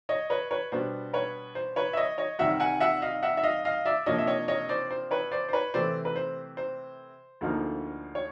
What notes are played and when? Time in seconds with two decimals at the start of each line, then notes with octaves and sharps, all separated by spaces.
0.09 C#5 D#5
0.30 B4 C#5
0.51 B4 C#5
0.72 B2 G3 B3 D4 C5
1.13 B4 C#5
1.55 C5
1.76 B4 C#5
1.93 E5
1.97 C#5 D#5
2.18 C#5 D#5
2.39 C2 C3 D#3 G3 E5 F#5
2.60 F#5 G#5
2.80 E5 F#5
3.02 D#5 F5
3.23 E5 F#5
3.37 E5
3.43 D#5 F5
3.65 D#5 F5
3.85 D5 E5
4.06 C3 F3 A#3 D4 C#5 D#5
4.18 E5
4.27 C#5 D#5
4.48 C#5 D#5
4.69 C5 D5
4.91 C5
5.11 B4 C#5
5.32 C5 D5
5.49 C5
5.53 B4 C#5
5.74 C3 E3 A3 C5 D5
6.05 B4
6.16 C5
6.57 C5
7.41 D2 D3 F3 A#3 D#4
8.15 C#5